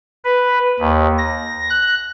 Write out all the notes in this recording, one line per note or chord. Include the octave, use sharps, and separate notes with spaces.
B4
D#2
A#6
F#6